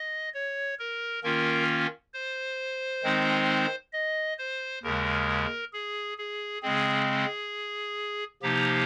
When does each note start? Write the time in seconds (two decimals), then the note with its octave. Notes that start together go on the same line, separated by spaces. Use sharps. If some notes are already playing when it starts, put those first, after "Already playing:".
Already playing: D#5
0.34 C#5
0.79 A#4
1.23 D#3 A#3 C#4 F4 A#4
2.14 C5
3.03 D#3 G#3 C4 D#4
3.93 D#5
4.38 C5
4.83 D#2 C#3 G#3 A#4
5.73 G#4
6.18 G#4
6.62 C#3 G#3 C4 G#4
8.42 C3 F3 A#3 D#4 G4